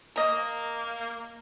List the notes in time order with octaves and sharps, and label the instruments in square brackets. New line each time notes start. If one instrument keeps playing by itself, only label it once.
[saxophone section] A#3 [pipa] A#4 D#5